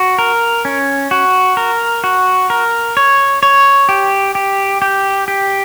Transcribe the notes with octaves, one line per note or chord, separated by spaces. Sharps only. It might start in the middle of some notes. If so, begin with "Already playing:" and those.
Already playing: F#4
A#4
C#4
F#4
A#4
F#4
A#4
C#5
C#5
G4
G4
G4
G4